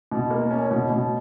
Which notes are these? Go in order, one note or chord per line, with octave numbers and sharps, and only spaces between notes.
B2
A#3
C#4
B2
B2